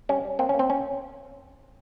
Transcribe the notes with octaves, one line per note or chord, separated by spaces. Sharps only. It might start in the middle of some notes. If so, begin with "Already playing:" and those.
G3 C#4
G3
A#3 C4
C#4
A#3 C4
C#4